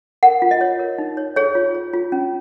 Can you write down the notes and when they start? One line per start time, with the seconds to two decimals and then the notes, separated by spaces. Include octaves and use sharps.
0.23 A#4 F#5
0.42 F4
0.51 D#5
0.61 C#5
0.79 A#4
0.98 D#4
1.17 C#5
1.36 G#4 C#5
1.55 F4
1.75 C#5
1.93 F4
2.12 C#4